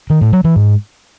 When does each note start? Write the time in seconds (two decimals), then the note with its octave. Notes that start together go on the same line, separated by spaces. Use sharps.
0.10 D#3
0.21 A2
0.33 F#3
0.44 E3
0.56 G#2